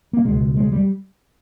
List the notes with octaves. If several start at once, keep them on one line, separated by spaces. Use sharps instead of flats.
A#3
C#2 B2 G#3
G#3
G3